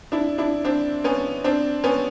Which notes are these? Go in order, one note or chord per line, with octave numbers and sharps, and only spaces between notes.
D4 E4
D4 E4
C4 D4
B3 C#4
C4 D4
B3 C#4